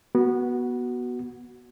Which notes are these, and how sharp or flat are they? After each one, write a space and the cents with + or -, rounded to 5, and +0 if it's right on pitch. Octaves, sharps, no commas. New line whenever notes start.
B3 -20 F#4 +10